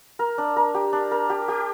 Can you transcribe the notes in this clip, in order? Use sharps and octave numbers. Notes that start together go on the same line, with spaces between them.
A#4
D4
A#4
G4
D4
A#4
G4
G4